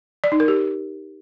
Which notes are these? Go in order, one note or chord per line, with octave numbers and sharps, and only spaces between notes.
D5
D#4
A#4
G4